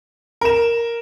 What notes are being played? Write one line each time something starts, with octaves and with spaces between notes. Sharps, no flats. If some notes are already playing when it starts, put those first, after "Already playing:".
A#4 E7